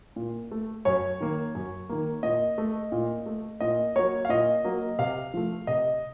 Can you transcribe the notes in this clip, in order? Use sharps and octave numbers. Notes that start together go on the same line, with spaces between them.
A#2
A3
F#2 C#5
D#3 A#3
F#2
D#3 A#3
A#2 D#5
A3
A#2
A3
A#2 D#5
F#3 A#3 C#5
F5
A#2 D#5
F#3 A#3
C3 F5
F3 A3
C3 D#5